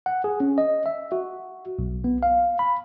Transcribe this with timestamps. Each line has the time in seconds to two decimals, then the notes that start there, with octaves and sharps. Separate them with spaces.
0.06 F#5
0.24 G#4
0.40 C#4
0.58 D#5
0.86 E5
1.12 F#4
1.79 B1
2.04 B3
2.23 F5
2.59 B5